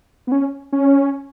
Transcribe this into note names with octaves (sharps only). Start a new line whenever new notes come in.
B3
C#4
C#4